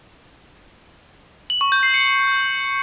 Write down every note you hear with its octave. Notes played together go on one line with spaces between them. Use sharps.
F#7
C#6
G6
C7
C#7